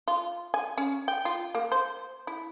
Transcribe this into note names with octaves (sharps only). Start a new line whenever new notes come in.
F4
G#5
C#4
G5
F4
A#3
C5
E4